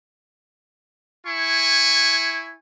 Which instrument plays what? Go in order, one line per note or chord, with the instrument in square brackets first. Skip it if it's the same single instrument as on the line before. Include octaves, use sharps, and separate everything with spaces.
[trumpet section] E4 G#5 C#6